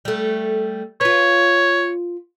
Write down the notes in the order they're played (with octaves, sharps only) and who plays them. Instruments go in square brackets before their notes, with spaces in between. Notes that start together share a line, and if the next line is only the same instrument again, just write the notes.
[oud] G3 A3
[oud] F4 B4 [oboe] C#5